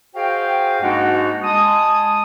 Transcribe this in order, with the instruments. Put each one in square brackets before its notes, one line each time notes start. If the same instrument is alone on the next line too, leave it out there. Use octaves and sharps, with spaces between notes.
[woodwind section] F#4 G#4 C5 D#5 F5 G5
G#2 G#3 A#3 D4 D#4 F#4
G#3 A5 D#6